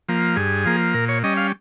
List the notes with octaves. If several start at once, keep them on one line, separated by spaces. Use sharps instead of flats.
F3 A#3
G2 G#4
F3 A#3
A#2 A#4
C#5
G3 C#4 D#5
F5